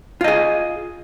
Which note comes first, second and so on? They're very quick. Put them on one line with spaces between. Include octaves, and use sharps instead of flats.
F4 D#5 G#4